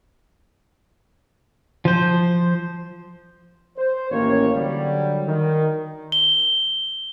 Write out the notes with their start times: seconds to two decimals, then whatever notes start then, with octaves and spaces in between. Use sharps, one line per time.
1.85 F3 C5
3.78 C5
4.11 A1 D#2 A#3 C#4 C#5
4.56 D3 F#3 G3
5.27 D#3
6.12 G7